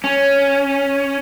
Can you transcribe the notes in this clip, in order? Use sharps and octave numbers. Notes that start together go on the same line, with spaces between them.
C#4